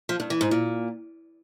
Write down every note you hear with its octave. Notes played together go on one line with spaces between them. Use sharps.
F3
G2
E3
G#2
A#2